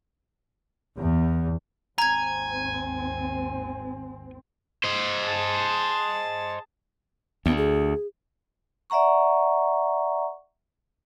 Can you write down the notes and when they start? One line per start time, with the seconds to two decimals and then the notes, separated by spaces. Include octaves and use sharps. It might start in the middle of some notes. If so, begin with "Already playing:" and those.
0.97 E2
1.98 G#1 D#2 C4 G#5 A#5 G#6
4.84 C5 D#5
5.22 G#4 A5
7.46 D2 B3
7.57 G#4
8.90 D5 E5 F#5 A#5 C#6